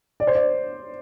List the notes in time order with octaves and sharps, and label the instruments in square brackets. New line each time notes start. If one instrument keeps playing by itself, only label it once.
[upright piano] D5
C5
D5